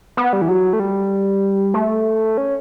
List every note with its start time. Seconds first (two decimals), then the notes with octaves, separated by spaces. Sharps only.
0.17 B3
0.33 G3
0.42 E3
0.49 F#3
0.73 A3
0.80 G3
1.74 A3
2.38 C#4